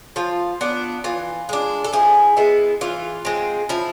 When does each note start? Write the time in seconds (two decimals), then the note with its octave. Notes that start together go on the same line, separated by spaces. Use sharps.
0.16 F3 F4
0.61 B3 D4
1.04 E3 F4
1.49 G#3 D4
1.84 A4
1.93 F3 E4 G#4
2.37 G#3 B3 E4
2.81 E3 F4
3.25 G#3 C4
3.69 F3 E4